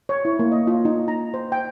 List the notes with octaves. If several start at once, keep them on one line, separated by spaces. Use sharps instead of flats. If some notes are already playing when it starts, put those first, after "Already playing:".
C#5
E4
A#3
D#5
F4
D#4
A#5
C5
G5